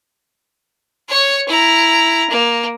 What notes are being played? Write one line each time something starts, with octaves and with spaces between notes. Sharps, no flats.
C#5 C#6
E4 A#5
A#3